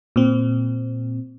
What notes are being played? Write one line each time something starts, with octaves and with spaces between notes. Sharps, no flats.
A#2 C4